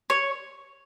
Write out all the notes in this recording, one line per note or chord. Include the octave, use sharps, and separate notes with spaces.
C#5